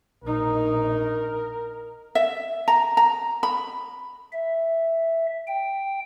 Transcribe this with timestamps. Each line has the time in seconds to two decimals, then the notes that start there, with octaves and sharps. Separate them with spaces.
0.24 A#1 D#4 A#4
2.15 E5
2.68 A#5
2.97 A#5
3.43 B5
4.32 E5
5.48 G5